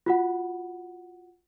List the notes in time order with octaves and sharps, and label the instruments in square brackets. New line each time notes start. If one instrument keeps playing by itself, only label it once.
[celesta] F4 F#4 F#5